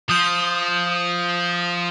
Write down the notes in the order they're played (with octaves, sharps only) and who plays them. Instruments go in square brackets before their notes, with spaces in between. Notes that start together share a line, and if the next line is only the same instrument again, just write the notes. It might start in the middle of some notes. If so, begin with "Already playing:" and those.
[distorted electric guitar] F3 [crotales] D#6 G6